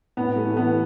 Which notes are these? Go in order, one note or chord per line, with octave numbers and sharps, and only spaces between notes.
A2 B3
A3
E3
B3